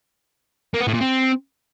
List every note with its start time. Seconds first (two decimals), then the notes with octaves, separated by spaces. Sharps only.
0.74 A#3
0.81 B3
0.87 A2
0.94 A#2
1.01 C4